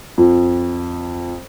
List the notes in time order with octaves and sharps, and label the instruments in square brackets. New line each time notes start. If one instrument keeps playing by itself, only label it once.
[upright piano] F2